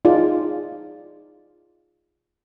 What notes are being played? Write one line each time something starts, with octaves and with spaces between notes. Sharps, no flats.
D#4 F4 G#4 D5